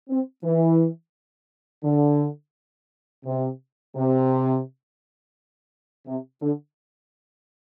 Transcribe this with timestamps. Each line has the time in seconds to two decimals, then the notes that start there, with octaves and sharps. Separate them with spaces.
0.09 C4
0.44 E3
1.84 D3
3.25 C3
3.95 C3
6.06 C3
6.41 D3